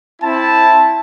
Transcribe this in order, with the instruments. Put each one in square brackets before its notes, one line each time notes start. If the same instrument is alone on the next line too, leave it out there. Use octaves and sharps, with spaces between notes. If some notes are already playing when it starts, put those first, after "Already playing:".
[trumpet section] C4 E4 A5